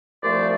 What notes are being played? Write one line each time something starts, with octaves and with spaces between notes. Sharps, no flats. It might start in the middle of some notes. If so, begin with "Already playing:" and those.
C2 A#2 F3 A3 C5 D5